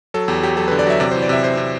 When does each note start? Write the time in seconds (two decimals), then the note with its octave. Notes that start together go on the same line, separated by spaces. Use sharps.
0.14 F#3 A4
0.28 E2 G4
0.43 F#3 G4
0.57 F#3 A4
0.68 B4
0.71 D3
0.79 D5
0.87 F#3 E5
1.00 C3 D5
1.11 C5
1.15 E3
1.22 D5
1.29 C3 E5
1.43 C3 C5
1.57 C3